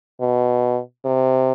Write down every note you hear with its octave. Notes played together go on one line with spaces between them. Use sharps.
B2
C3